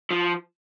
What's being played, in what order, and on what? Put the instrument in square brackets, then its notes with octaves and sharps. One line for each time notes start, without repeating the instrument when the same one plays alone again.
[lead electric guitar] F3